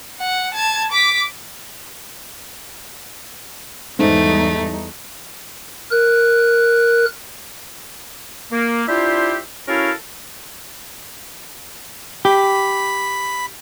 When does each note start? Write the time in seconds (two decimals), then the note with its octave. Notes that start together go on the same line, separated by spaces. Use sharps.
0.20 F#5
0.54 A5 G#6
0.92 D6 B6
3.99 E2 G#2 G3 A3 D#4
5.91 A#4 F#6
8.52 A#3
8.88 D4 E4 F4 G4 C5 E5
9.68 C#4 E4 F#4 A4 A#4 F5
12.25 G4 B5